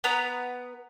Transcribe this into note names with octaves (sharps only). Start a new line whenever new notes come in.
B3 B4 A#5 D#6